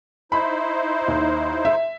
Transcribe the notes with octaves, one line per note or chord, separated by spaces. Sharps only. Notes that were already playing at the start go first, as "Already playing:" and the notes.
D#4 E4 C5 B5
D#2
E5